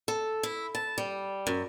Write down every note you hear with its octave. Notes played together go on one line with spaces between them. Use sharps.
A4
E4
A5
G3
F#2